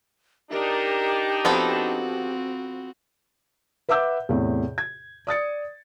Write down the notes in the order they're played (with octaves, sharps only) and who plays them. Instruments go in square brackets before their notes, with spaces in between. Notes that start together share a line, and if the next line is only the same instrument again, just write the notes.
[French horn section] D4 D#4 [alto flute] G4 [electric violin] A#4
[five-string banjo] F3 B3 A4 [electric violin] C4 F#4
[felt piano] B4 E5 F#5 D6 E6 G6
E2 A2 C3
G#6
D5 D#6 A6 C#7